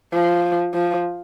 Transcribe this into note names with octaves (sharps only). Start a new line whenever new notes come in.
F3
F3